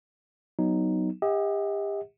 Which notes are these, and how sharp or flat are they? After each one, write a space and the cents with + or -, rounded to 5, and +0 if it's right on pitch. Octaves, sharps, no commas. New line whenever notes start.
F#3 +0 B3 +0 D#4 -5
G4 +35 D#5 +40 F#5 -10